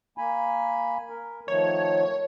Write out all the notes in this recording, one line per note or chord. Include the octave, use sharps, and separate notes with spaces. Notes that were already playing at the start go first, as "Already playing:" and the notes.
A#3 G#5 B5
A#4
D#3 F3 A3 C#5